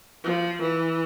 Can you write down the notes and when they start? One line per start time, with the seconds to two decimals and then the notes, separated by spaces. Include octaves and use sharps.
0.24 F3
0.61 E3